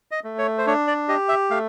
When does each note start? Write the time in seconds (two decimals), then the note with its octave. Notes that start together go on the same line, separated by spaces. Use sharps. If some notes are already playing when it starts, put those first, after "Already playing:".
0.11 D#5
0.24 A3
0.38 C#5
0.58 C5
0.67 D4 C#5
0.87 D5
1.08 G4 D#5
1.29 E5
1.50 A3 F5